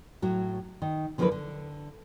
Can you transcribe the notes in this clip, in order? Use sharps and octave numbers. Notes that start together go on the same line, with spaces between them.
A2 F#3 F#4
D#3
D3 F3 F#3 E4 A#4 B4
D3